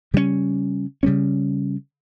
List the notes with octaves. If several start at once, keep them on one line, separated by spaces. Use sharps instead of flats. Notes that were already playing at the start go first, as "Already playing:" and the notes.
C#3 G3 A#3 C#4
C#3 G3 A#3 C#4